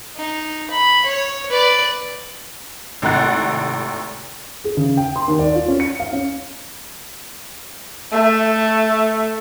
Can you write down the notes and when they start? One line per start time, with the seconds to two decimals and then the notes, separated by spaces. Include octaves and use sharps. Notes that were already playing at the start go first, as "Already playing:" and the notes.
0.16 D#4
0.71 B5
1.05 C#5
1.50 B4 D5
3.02 G#1 A2 C3 F#5 F#6 A6
4.64 G#4
4.77 C#3
4.97 G5
5.16 C6
5.27 D#2
5.39 D5
5.55 F4
5.68 C#4
5.80 C#7
6.00 F5
6.12 C#4
8.12 A3